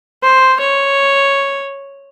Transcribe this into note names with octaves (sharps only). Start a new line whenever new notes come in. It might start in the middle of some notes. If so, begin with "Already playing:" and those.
C5
C#5